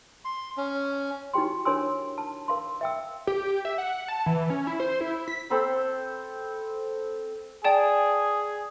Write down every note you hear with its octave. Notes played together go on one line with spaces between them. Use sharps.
C6
C#4
D#4 E4 F#4 G4 G5 C6
D4 A#4 C#5 G#5 C6 E6
A5
A#4 F5 C6
E5 G5 E6
G4
E5
F#5
A5
E3
C#4
E4
C5
E4
B6
C4 A4 B5 C6
G#4 D5 G5 A5